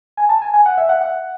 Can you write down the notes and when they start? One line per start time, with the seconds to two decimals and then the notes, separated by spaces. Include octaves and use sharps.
0.17 G#5
0.29 A5
0.42 G#5
0.54 G#5
0.66 F#5
0.77 E5
0.89 F#5
1.01 F#5